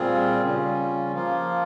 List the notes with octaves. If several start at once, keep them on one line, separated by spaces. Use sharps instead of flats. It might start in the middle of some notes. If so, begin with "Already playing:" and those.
Already playing: A#2 G3 C4 F4 G#4
C#3 G3 C#4 F4
F3 A#3 F4